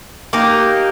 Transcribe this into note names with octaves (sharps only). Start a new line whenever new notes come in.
A#3 D#4 G4